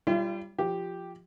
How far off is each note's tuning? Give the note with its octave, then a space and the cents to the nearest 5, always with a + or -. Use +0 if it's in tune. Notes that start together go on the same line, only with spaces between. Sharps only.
G3 +0 F4 -35 E5 +45
F3 +0 G4 +0